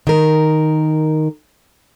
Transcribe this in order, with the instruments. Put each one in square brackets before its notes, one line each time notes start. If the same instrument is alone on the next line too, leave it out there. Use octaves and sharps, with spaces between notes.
[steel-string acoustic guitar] D#3 A#4